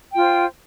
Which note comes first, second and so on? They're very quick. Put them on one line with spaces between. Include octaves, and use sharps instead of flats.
G5 F4 C5